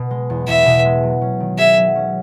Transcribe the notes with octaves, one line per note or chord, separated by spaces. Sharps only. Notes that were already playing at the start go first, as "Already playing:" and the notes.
Already playing: B2
G#3
E2
E2 E5
B2
G#3
F#3
C#4
D#3
G#4 E5
F#3
C#4